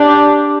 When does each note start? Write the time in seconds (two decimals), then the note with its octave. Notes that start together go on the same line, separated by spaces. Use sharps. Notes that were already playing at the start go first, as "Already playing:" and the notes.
Already playing: D4 G4